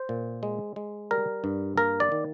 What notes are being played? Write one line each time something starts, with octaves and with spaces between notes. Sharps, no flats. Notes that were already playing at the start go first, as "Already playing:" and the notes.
Already playing: C5
A#2
G#3
G#3
G3 A#4
G2
A#3 A#4
D5
D#3